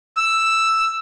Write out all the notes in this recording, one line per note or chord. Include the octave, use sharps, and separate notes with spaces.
E6